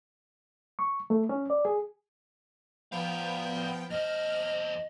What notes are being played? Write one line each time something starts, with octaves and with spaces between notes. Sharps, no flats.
C#6
A3
C#4
D5
G#4
F3 B3 D5 F5 G5
E2 C5 D#5 F6